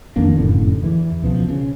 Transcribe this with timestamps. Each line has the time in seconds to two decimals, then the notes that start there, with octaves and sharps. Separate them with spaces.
0.16 F2 D#3 A#3 D4
0.36 F1 F#2 A2 D3
0.82 E2 E3
1.22 C#2 B2 F3
1.48 C#3